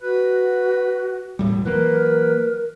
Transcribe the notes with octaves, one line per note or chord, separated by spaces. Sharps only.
F#4 B4
E1 A2 G3
E3 F#3 A#3 A#4 B4